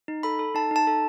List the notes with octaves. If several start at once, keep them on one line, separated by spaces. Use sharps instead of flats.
D#4
A4 B5
A4
D#4 A5
D#4 A5
A4